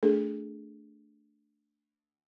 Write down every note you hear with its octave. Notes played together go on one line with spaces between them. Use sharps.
A3 D4 G#4 A4